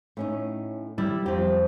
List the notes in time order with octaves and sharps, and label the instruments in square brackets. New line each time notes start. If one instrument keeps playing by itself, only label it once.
[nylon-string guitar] A2 C#4 D#4
[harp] G3 [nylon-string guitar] E4
[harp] F2 C4 [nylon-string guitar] G4